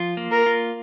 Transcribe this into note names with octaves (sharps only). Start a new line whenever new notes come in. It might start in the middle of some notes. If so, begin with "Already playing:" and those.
Already playing: F3 F4
A#3
A#4
F4